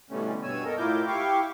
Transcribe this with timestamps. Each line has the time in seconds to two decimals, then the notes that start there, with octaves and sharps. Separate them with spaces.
0.11 B2 D3 E3 G3 A3 C#4
0.43 G2 B2 G3 C#5 G#5 E6
0.65 A4 A#4 D#5
0.78 A2 E4 F4 A#4 D6 G6
1.07 E4 G4 F5 G5 C#6 D6